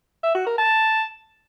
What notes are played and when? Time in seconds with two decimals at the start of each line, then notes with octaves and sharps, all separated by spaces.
0.23 E5
0.35 F#4
0.46 A#4
0.58 A5